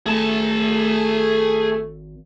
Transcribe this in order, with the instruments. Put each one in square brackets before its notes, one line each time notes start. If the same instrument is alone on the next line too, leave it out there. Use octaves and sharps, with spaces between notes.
[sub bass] G#1 [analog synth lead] A3 [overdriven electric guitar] G#4 A5